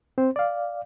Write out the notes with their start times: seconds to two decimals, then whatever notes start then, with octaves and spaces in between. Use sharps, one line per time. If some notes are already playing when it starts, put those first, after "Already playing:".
0.18 C4 C5
0.36 D5 F5